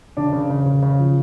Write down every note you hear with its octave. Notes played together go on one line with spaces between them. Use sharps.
C#3 D4
C#3
C#3
C#3
C#3
F3